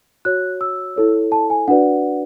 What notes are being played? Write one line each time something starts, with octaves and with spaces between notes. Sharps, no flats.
F#4 C#5 F#6
E6
E4 A4 C#5
A5
G#5
D4 F#4 B4 D5 F#5